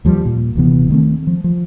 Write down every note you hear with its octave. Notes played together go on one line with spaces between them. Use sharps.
D#2 F3 G3
A#2
D#1 C3 E3 B3
D#3 A3 C4
F3
F3